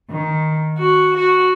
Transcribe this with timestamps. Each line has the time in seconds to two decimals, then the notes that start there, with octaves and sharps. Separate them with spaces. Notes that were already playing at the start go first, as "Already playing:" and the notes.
0.10 D#3
0.78 F#4
1.17 F#4